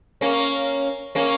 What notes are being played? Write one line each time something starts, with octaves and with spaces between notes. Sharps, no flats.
A#3 C#4
A#3 C#4